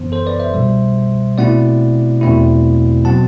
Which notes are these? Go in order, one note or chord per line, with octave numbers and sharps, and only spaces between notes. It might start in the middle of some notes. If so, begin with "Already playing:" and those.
Already playing: F#2 E3 B3 C5
A4 C5
B4 D5
C5 E5
C2 B2 G3
B2 A3 C4 E4 D5 F#5
E2 B2 A3 C4 E4
B2 F#3 C4 F#5 A5